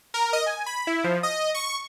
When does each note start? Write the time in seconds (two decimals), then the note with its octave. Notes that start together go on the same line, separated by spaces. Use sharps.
0.14 A#4
0.33 D#5
0.46 G#5
0.66 B5
0.87 E4
1.04 F3
1.23 D#5
1.54 C#6